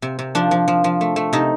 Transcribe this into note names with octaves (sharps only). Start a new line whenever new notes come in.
C3
C3
F3 D4
F3
F3
F3
A3
A3
C3 D#4